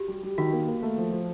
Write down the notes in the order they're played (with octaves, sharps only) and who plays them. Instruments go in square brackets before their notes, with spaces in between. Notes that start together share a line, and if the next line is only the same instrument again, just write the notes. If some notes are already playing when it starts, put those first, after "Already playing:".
Already playing: [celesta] F#4 G4
[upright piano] G3
G3
[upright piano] D#3 [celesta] F#4
[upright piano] A#3
A#3
A3
F3
F3